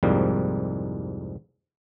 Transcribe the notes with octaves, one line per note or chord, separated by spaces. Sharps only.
C2 F2 G#2 F3 G3 A#3